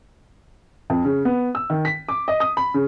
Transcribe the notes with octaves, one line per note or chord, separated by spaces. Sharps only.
F2
C#3
B3
E6
D#3
B6
D6
D#5
D#6
B5
C#3